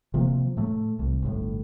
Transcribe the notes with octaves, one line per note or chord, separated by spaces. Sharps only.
C3 F3 A#3
A2 A3
C2
G1 A2